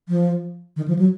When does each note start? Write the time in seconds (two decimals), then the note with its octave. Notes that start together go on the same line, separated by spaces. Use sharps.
0.09 F3
0.77 D#3
0.88 F3
0.99 F#3